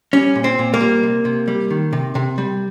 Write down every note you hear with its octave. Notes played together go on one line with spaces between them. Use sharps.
G3 C#4
A#2
C4
A#2
A#3
G3
C3
C3
G3
D#3
C3
C3
G3